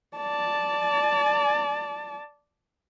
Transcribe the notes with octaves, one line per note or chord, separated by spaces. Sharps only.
D5 A5